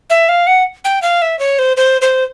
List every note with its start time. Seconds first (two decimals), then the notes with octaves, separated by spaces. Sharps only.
0.10 E5
0.29 F5
0.47 F#5
0.85 G5
1.02 F5
1.22 E5
1.39 C#5
1.59 C5
1.77 C5
2.02 C5